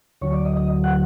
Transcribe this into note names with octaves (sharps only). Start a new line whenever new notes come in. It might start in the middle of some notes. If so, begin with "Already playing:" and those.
D2 D3 F#3 C#5
D5
D#5
D#5
F#5